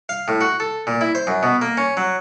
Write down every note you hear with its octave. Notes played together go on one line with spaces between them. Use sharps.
F5
A2
F#4
A4
A#2
E4
C5
F#2
B2
A#3
C#4
F#3